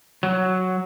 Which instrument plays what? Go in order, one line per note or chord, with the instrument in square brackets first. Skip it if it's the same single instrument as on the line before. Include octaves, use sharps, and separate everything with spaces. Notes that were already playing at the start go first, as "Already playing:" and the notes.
[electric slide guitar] F#3